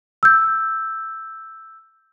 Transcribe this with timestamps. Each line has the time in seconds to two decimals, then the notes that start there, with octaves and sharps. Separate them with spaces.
0.23 E6 G6